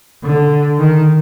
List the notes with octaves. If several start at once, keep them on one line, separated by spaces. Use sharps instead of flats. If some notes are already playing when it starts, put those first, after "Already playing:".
D3
D#3